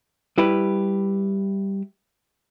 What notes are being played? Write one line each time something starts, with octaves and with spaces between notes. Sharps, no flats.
G3 E4 G4 B4